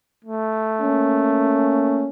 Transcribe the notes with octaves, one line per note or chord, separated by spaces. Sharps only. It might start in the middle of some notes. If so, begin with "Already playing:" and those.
A3
A#3 C#4